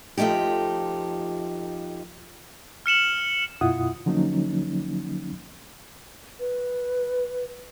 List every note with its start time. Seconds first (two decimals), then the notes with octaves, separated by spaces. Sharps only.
0.17 F2 F3 A3 D#4 G4
2.86 F6 C#7 E7 F#7
3.61 F#2 B2 E4 F4 F#5 D#6
4.06 D3 F3 F#3 A#3 C#4 D#4
6.40 B4